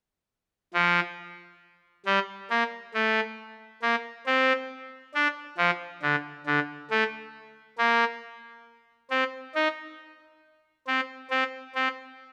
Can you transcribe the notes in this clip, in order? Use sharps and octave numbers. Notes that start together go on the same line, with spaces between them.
F3
G3
A#3
A3
A#3
C4
D4
F3
D3
D3
A3
A#3
C4
D#4
C4
C4
C4